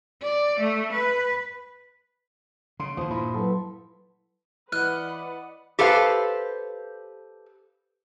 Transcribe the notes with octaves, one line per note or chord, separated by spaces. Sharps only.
D5
A3
B4
C#3 C6
D#2 D3 E3 F3 D#6
G2 A#2 E4
F#3 A4 B4
E3 B4 D5 D#5 F#5 F6 F#6
G4 A4 B4 C5 F5